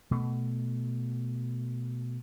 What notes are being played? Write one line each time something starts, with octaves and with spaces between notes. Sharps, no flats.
B2 A3